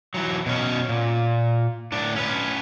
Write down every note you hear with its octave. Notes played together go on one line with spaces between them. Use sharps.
E3 F#3
B2 C#4
A#2
A2 D4
C#4 B4